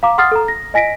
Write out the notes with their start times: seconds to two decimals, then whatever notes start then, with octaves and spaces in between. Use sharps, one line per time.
0.03 F5 A#5 D6
0.18 F#5 C6 D#6 F6 A6 C7
0.32 A4 A#5
0.48 A#6
0.74 D#5 G#5 A#6 B6 D7